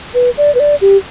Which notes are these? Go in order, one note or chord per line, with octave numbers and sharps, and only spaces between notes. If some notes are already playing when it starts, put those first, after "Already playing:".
B4
D5
B4
D5
G4